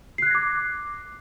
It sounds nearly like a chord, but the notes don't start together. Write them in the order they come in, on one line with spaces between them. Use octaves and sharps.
C7 F#6 G#6 A#6 D6